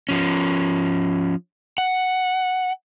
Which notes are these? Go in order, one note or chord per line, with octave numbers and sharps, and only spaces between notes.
F3 C#4
F#5